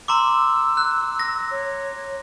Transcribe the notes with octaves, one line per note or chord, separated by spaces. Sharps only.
A#5 C6 D6 E6
F#6
A#6
C#5